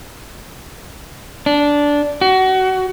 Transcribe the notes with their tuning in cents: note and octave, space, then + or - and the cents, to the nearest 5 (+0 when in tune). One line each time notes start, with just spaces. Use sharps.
D4 -10
F#4 +25